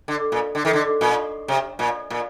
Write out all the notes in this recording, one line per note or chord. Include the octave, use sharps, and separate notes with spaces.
D3
A#2
D3
D#3
D3
A#2
C3
A#2
A#2